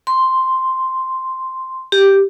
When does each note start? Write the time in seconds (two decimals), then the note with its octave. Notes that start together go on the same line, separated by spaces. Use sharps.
0.07 C6
1.92 G4